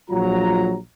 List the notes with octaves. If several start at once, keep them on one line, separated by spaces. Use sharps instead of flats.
A#1 F#3 F4 A#5